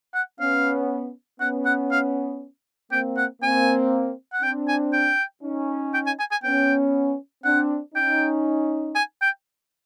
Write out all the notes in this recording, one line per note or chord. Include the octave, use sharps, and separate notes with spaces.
F#5
B3 C#4 F5
B3 C#4 F#5
F#5
F5
A#3 C4 G5
F#5
A#3 C4 G#5
F#5
C4 D4 G5
G#5
G5
C#4 D#4
G5
G#5
G#5
G#5
B3 C#4 G5
C4 D4 F#5
C#4 D#4 G5
G#5
G5